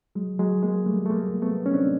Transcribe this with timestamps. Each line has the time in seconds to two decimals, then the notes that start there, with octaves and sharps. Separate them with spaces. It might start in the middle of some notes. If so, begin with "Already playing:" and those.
0.15 F#3 G#3
0.39 F#3 G#3
0.63 G#3 A#3
0.86 G3 A3
1.06 A3
1.10 G#3 A#3
1.42 A3 B3
1.66 C#4
1.74 C4 D4